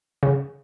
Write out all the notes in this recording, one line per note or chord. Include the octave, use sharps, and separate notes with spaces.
C#3